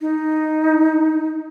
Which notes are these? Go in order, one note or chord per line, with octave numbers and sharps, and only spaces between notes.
D#4